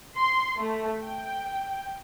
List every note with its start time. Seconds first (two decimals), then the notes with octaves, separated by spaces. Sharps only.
0.17 C6
0.58 A3
1.03 G5